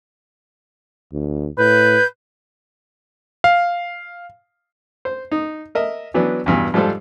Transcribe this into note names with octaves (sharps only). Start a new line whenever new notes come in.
D2
A2 B4 G6
F5
C5
D#4
A#4 D#5 E5
E3 F#3 B3 D4
E2 G2 B2 E3
G#2 F3 G3 A4 C5